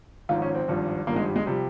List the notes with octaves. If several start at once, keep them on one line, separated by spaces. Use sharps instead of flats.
G#1 G#2 F3 F4
C#4
C4
G#1 G2 F3
G#1 G2 F3 A#3
G#3
G3
G#3
C3 F3 G3